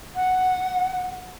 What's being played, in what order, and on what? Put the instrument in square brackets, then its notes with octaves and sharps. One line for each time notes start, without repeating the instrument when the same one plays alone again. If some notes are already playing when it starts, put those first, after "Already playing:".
[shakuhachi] F#5